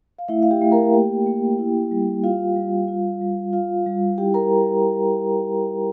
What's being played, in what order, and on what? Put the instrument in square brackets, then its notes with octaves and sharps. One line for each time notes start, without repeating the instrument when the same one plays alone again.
[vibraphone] F5
A3 E4 E5
F5
G4 G5
A3
A#4 A#5
A#3 G4 G5
A#3
E4
G3
F4 F5
G3
F4
G3
F4 F5
G3
E4 G4 G5
A#4 A#5